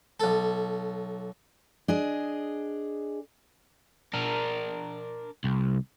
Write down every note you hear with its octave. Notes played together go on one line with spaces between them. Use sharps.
B1 A4
D4 G#4 D#5
D4 A#4
C2